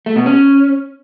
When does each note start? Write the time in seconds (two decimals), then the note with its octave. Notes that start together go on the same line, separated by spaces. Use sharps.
0.06 A3
0.16 B2
0.26 C#4